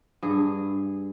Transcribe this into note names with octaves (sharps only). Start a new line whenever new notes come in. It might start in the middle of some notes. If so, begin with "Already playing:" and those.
G2 G#4